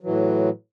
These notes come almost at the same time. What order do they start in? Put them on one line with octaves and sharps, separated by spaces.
F#3 E3 A2